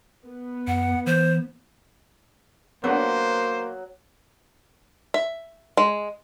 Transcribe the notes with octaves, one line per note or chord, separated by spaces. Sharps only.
B3
F#2 F#5
E3 C5
F#3 A#3 B3 D4 C5
E5
G#3